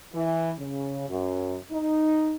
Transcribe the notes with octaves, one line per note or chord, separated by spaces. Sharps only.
E3
C#3
F#2
D#4